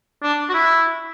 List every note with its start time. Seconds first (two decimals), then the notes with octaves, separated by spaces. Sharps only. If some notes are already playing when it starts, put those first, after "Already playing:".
0.23 D4
0.49 F#4
0.54 E4